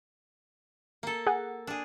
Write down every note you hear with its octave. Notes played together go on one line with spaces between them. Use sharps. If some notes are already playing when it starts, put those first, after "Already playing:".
A#3 A4
G#4 F#5
D4 G#4